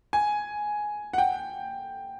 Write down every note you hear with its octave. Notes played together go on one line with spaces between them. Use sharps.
G#5
F#5
G5